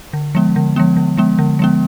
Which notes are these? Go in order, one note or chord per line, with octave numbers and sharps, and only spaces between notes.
D3
F3 G#3 B3
D3
F3 G#3 B3
D3
F3 G#3 B3
D3
F3 G#3 B3